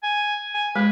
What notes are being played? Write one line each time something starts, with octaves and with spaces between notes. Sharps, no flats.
G#5
G#5
G#3 B4